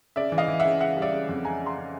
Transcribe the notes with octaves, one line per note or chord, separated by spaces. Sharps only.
C#3 D5 E5
E3
D#5 F5
E3
C#3 E5 F#5
C#3 E5 F#5
G3
D5 E5
C#3
F2
C#3 G#5 A#5
C#3
A#5 C6
C#3